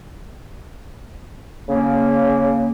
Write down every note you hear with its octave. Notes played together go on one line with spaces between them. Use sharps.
C#3 A#3